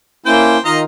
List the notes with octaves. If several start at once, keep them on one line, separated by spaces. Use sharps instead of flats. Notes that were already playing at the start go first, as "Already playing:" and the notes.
A#3 C#4 E4 C5 G5
D#3 D#4 F4 D#5 F5 A#5